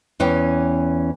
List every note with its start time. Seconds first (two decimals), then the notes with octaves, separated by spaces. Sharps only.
0.20 E2 E3 C#4 G5